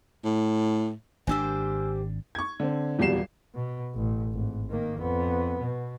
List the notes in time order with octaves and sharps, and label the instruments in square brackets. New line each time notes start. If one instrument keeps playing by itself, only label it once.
[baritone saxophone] A2
[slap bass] G#1 C4 D4 [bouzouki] A#3 G4 C5 [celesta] G#5 E6
[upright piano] C#6 G#6
D3 C4
D#1 E2 F#3 G3 C7 E7
[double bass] B2
A1
G#1
D#3 A#3
F2 B3
B2